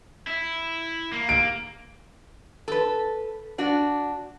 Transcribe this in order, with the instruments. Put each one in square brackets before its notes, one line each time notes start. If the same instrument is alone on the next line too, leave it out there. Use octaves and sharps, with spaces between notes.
[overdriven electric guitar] E4
A#3
[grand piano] D7
[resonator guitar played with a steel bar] A4 B4
D4 F#4